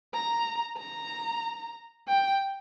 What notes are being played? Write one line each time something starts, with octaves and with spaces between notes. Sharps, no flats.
A#5
A#5
G5